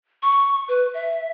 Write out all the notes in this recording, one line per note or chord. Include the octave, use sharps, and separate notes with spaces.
C#6
B4
E5